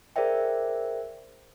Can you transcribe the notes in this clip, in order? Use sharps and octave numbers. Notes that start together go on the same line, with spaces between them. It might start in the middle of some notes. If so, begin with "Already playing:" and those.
G#4 A#4 C5 D5 E5 G5